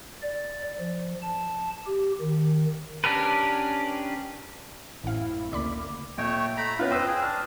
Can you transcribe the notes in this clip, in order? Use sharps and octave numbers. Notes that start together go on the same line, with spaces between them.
D5
F3
A5
G4
D#3
C#4 D4 G4 A#4 B4
A1 F#2 A2 C4 E4 F5
D2 C#3 A#3 D5 B5 D6
A#2 A3 C#5 D#5 G5
A3 A#5 B5
B3 C#4 F4 B4
C5 D#5 G5 E6 F#6
G#4
D4 F6